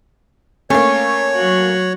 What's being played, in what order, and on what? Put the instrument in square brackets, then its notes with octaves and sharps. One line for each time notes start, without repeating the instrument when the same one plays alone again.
[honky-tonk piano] A3 A#3 [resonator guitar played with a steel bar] C#4 [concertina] C#5
[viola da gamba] F#3 F#4